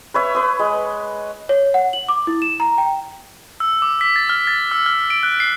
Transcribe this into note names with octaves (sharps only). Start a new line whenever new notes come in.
B4 C#5 E5
B4 D#6
G#3
C#5
F#5
F#7
D6
E4
E7
A#5
G5
E6
D6
B6
A6
F6
A6
E6
F6
D7
F#6
C7